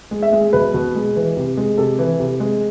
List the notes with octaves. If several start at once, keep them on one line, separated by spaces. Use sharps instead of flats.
G#3
E5
G#3
B2 B4
B2
G#3
E3
C3
G#3
C3 A4
E3
C3
G#3